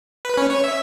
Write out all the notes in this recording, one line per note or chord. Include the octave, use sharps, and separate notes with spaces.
B4
C#4
C#5
E5